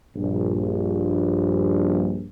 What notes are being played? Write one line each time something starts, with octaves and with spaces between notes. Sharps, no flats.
A#1 G2